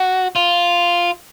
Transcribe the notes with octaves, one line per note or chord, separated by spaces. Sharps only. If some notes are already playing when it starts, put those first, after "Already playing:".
Already playing: F#4
F4